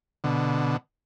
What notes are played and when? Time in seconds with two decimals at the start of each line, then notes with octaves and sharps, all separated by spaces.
0.24 B2 D3